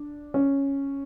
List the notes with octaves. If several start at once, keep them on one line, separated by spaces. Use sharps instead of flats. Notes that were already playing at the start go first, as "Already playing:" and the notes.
Already playing: D4
C#4